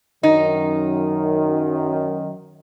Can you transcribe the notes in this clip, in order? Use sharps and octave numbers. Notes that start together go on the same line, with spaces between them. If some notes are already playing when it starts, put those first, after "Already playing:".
F#2 D#3 D#4